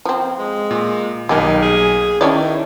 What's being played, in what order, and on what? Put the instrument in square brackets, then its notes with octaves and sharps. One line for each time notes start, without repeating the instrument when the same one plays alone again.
[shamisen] F3 C4
[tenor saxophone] G#3
[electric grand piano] A#2
[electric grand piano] B1 G#5 [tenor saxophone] D#3 [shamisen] G3 A#3 D#4
[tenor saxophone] G#4
[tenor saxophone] D#3 [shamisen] C#4 C#5 D5 [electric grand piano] E4